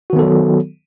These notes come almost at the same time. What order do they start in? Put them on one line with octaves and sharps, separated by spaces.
F#4 D#3 B3 A4 F#3